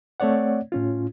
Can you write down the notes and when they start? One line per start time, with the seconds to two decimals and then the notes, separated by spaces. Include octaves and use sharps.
0.20 A3 C4 C#5 D5 F#5
0.72 A2 C#4 F4